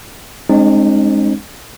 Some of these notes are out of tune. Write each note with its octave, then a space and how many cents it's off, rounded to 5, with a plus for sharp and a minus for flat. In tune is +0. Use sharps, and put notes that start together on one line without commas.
G#3 +0 C4 +30 D#4 -40